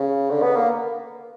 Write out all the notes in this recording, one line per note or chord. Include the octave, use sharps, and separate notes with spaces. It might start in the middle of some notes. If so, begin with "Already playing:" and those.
Already playing: C#3
D3
B3
A#3